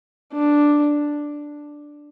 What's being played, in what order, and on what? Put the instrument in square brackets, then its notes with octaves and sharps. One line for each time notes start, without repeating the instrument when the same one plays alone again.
[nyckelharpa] D4